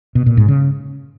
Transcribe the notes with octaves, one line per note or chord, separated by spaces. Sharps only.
B2
A#2
G#2
C#3